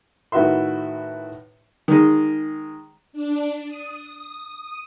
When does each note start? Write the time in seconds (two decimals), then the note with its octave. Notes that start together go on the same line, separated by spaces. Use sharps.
0.32 A2 D#3 F#4 B4 E5 C6
1.88 D#3 G#3
3.13 D4
3.68 D#6